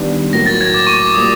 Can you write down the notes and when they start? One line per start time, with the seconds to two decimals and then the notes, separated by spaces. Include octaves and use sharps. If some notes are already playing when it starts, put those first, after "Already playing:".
Already playing: D#3 G3 B3 D4 G4
0.33 A2 F#3 A#3 A#6
0.46 A6
0.61 G#6
0.74 D6
0.87 C#6
1.01 D6
1.14 A#2 G3 A#3 D#6